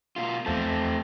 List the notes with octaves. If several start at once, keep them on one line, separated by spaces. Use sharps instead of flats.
B2 F4
E2 A3 C4 A5